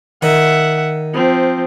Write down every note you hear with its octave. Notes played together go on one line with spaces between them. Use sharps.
D#3 E5 F#5
F3 C4